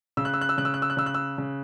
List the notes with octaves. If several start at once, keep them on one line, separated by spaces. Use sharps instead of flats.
C#3 E6
F#6
E6
F#6
E6
C#3 F#6
E6
F#6
E6
F#6
C#3 E6
F#6
E6
C#3